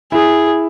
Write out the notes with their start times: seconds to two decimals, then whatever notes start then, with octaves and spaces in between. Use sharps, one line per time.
0.12 E4 G#4